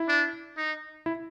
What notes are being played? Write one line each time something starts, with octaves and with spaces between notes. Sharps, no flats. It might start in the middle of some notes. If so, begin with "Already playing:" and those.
Already playing: E4
D4
D#4
E4